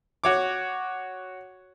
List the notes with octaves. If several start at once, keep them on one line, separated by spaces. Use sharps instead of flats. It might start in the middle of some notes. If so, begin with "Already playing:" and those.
F#4 C#5 D6